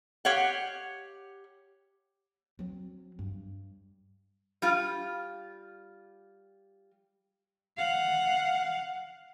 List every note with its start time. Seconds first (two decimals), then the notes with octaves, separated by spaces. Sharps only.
0.25 G4 C#5 F5 F#5
2.59 F#3 C4
3.19 G2
4.62 G3 F4
7.77 F5 F#5